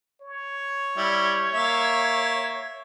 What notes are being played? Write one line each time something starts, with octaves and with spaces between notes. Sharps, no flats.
C#5
G3 E4
A#3 E5